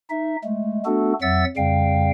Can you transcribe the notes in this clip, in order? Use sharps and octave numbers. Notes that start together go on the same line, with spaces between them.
D#4 E5
G#3 A3
A3 B3 D4 F#4 A4
F2 F#3 E5 F#5 E6 A6
F2 C#3 G3 F5 G5